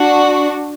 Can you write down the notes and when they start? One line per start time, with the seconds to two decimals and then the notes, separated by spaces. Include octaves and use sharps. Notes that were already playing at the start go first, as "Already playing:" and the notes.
Already playing: D4 F#4